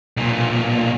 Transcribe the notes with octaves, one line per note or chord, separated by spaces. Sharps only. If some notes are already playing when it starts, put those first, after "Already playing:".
B1 A#2